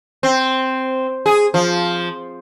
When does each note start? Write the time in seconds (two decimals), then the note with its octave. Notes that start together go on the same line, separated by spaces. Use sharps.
0.23 C4
1.26 G#4
1.54 F3